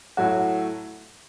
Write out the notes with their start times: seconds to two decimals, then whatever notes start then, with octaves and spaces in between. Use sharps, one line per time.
0.17 A2 F#3 A3 F#4